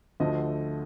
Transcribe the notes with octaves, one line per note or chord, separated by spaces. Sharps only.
D2 D3 F3 A3 D#5